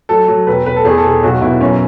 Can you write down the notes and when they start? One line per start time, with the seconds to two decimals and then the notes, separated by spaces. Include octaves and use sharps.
0.09 F#3 A4
0.28 F#3
0.47 E1 B4
0.66 E1 B4
0.76 A4
0.85 E2 G#4
0.98 A4
1.04 E1 G#4
1.23 B1 F#4
1.41 B2 E4
1.60 F#2 C#4